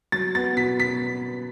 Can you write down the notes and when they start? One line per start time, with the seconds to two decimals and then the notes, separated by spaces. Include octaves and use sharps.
0.12 F#3 A6
0.35 B3 A6
0.57 B2 B6
0.79 B2 B6